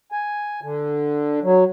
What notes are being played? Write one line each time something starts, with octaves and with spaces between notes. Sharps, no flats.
G#5
D3
F#3